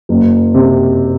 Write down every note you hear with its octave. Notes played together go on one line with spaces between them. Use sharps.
F#1
C3